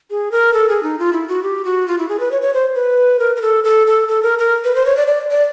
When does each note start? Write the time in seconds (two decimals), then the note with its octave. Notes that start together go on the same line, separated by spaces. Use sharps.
0.10 G#4
0.32 A#4
0.53 A4
0.69 G#4
0.83 D#4
0.99 F4
1.13 E4
1.28 F#4
1.43 G4
1.65 F#4
1.88 F4
1.98 E4
2.09 G#4
2.20 B4
2.32 C#5
2.42 C#5
2.54 C5
2.75 B4
3.19 A#4
3.36 A#4
3.42 A4
3.64 A4
3.87 A4
4.08 A4
4.23 A#4
4.39 A#4
4.64 B4
4.75 C5
4.86 C#5
4.97 D5
5.08 D5
5.31 D5